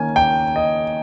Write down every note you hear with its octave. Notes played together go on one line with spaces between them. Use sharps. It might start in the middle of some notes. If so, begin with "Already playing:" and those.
Already playing: D#3 A#3 C#4 G#5
G5
D#5